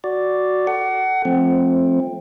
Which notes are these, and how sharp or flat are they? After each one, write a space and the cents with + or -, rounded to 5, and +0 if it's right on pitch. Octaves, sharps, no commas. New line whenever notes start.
F#4 +0 D5 +0
A4 +5 F#5 +25
F3 +0 A3 -15 C4 +15